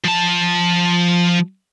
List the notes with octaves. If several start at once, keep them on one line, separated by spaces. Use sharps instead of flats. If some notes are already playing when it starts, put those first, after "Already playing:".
F3 A5